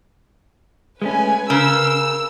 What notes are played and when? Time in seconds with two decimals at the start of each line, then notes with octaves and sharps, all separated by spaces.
1.02 G#3 A3 C#4 B4 G#5
1.50 C#3 A#4 E6